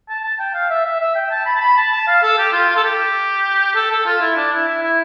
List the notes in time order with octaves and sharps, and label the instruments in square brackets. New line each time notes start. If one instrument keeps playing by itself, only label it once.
[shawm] A5
A5
G5
F5
E5
E5
E5
G5
A5
B5
A5
B5
A5
A5
F5
A4
G4
F4
F4
A4
G4
A4
A4
F4
E4
D4
E4
E4
E4